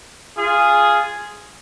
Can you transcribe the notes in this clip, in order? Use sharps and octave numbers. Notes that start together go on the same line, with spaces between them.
F4 G#4